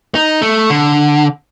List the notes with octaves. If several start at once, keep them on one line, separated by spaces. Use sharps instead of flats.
D#4
A3
D3